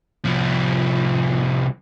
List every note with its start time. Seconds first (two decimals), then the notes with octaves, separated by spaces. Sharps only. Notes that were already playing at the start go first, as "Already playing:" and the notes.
0.25 C2 F3